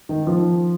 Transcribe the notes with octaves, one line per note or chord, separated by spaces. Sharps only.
D#3
F3